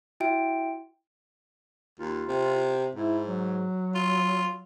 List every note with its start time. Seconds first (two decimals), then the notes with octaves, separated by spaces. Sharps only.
0.20 E4 F#4 E5 G5 D7
2.00 D#2 F4
2.28 C3
2.95 G#2 E4
3.27 F#3
3.95 F4